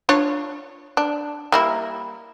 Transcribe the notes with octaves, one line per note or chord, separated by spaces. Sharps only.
D4 F4 C#5
D4
G3 A#3 E4